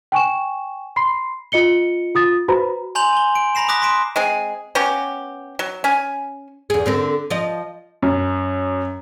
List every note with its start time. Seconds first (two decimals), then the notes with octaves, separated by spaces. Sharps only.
0.12 G5 G#5 C#6 E7
0.96 B5 C6 C7
1.52 F4 D#5 C#7 G7
2.15 F4 D#6 A6
2.48 F#4 B4 C5 A#5 B5
2.95 G#5 A#5 C6 G6 F7 F#7
3.13 G#5 G7
3.35 D7
3.55 A#5 B5 A#6 C7 E7
3.68 B5 D6 D#6 F#6 A#6 B6
3.82 C6 D#6 B6 D7 E7
4.16 G#3 C4 G#4
4.75 B3 C#4 F#4 G4
5.59 F#3
5.84 C#4 G#5
6.70 E2 G#4
6.86 D3 C4 A#4
7.30 F3 D#5
8.02 F#2